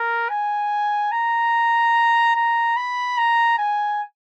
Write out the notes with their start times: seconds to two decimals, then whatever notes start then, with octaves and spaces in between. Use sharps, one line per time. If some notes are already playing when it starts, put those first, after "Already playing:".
Already playing: A#4
0.29 G#5
1.12 A#5
2.35 A#5
2.76 B5
3.18 A#5
3.58 G#5